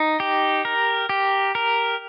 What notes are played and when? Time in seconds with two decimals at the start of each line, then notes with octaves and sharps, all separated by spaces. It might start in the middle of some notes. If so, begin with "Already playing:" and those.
Already playing: D#4
0.20 G4
0.65 A#4
1.09 G4
1.55 A#4